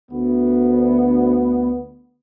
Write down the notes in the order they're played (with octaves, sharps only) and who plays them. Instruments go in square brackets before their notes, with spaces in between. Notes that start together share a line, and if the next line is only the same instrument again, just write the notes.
[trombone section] D2 B3